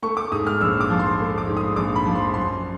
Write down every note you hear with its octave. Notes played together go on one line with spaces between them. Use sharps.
A3 C#6
D6
G#2 D#6
F6
A#1 E6
D6
F3
C6
A3
D6
G#2
D#6
A#1 D6
B5
F3
C6
F#2 C6